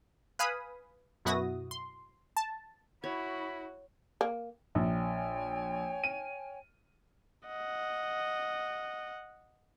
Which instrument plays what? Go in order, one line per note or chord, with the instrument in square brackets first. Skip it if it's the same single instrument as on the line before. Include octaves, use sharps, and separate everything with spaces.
[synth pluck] B4 F5 G#5 B5 D#6
F#2 B2 E4 F#4 D#6 A#6
C6
A5
[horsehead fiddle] E4 [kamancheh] F#4 [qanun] C#5 [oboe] B5
[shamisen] A#3
[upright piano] A#1 [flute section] C#5 G5 G#5
[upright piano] D#7
[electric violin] D#5 F#5